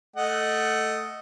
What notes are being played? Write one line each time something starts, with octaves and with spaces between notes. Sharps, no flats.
A3 D#5 F#5